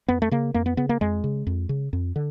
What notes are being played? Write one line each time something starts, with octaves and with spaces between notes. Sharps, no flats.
F2 B3
A3
C#3 A#3
F2 A#3
B3
C#3 B3
A#3
F2 G#3
C#3
F2
C#3
F2
D3